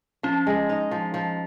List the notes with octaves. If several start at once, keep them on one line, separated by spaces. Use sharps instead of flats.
F3 C#4
G#3
D#4
F3
F3